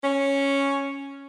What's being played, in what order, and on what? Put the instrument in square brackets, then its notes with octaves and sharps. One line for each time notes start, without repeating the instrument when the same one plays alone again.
[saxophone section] C#4